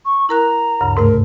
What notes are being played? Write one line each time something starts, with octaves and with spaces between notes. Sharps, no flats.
C#6
E4 A#4 A#5 F#6
D2 G2 C#3
G#2 C3 A3 A#4